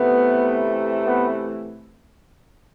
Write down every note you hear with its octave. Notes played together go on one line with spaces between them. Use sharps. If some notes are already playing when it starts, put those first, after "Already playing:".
Already playing: C3 E3 A3 B3
B3